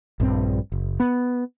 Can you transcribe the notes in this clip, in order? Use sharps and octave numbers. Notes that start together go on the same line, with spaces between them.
A#1 G2 C4
F#1
B3